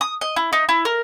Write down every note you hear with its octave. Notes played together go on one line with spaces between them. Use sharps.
D#6
D#5
E4
D#4
E4
A#4